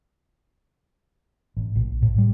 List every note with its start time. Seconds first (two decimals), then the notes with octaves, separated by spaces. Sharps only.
1.57 A1
1.76 A#1
2.02 A2
2.18 G3